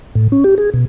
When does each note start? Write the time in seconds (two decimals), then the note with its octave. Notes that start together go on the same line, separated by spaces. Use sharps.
0.15 A2
0.32 C#4
0.44 G4
0.58 G#4
0.74 B2